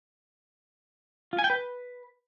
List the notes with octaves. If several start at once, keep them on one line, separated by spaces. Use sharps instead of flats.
F4
G#5
G5
B4